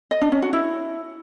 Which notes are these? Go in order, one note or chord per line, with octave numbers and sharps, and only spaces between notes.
D#5
D4
C#4
F#4
E4